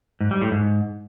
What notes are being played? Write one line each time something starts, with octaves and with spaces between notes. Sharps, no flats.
G#2
G3
A2
G#2